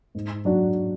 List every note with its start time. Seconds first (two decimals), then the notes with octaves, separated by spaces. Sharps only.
0.15 G#2
0.45 F#3 D4 F#4